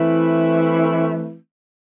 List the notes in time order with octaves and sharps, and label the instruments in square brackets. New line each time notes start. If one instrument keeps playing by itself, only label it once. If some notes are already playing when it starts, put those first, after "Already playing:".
Already playing: [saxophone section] E3 A3 C4 E4 B4